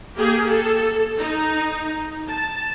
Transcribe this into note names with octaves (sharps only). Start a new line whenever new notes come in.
A#3 G4 G#4
A4
D#4
A5